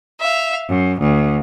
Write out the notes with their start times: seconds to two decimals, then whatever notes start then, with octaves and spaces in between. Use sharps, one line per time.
0.20 E5 F5
0.68 F#2
0.99 D2